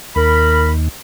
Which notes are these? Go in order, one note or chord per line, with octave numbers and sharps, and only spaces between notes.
D#2 A#4 B5